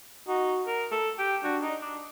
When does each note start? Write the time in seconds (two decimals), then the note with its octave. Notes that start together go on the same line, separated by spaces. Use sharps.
0.28 D#4 F#4
0.67 A#4
0.92 A4
1.19 G4
1.44 D4 F#4
1.62 D#4
1.82 D4